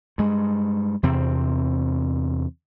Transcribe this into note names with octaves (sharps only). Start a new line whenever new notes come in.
G2 G#3
E2 C3 C4